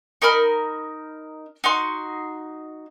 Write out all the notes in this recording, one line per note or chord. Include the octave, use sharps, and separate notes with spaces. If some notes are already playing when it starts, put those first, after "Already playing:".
D#4 A#4 B5 F6
D#4 F#4 C6